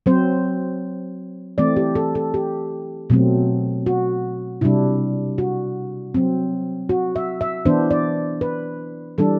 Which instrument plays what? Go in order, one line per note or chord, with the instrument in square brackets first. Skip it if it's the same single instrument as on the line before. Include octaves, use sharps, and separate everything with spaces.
[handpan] F#3 C4 C5
E3 A3 C4 D5
G4
A4
A4
G4
B2 F#3 A3 C4
F#4
C3 G3 D4 E4
F#4
F#3 C4
F#4
E5
E5
E3 B3 D4 C5
D5
B4
E3 G3 D4 A4